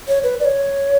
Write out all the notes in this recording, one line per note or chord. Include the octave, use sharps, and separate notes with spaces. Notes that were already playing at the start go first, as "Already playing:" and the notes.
C#5
B4
D5
C#5